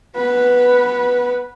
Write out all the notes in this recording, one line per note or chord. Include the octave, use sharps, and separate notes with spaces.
B3 B4